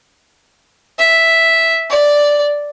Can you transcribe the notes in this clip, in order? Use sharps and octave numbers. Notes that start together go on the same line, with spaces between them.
E5
D5